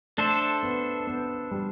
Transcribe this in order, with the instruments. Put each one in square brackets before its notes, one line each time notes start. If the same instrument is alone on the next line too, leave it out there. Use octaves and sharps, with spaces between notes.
[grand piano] A3 [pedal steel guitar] D4 A4 C5 E5
[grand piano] B3
B3
G3